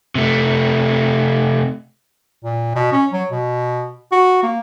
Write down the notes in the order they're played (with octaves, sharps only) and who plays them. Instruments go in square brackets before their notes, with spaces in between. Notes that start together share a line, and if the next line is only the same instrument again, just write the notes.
[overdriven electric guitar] C3 A3
[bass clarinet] A#2
B2
C#4
F#3
B2
F#4
A#3